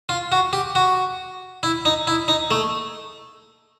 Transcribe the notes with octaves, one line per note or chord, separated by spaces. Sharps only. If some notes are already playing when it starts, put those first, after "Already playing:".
F4
F#4
G4
F#4
E4
D#4
E4
D#4
A3